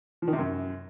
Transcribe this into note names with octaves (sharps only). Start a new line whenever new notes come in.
F3
D#3
C3
F#2